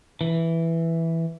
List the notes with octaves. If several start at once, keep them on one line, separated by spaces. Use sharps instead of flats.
E3